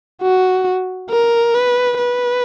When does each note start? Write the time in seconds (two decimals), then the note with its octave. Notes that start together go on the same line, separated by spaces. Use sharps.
0.22 F#4
1.11 A#4
1.55 B4
1.98 B4